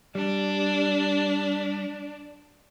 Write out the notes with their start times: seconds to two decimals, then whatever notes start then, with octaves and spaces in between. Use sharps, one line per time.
0.15 G3 D4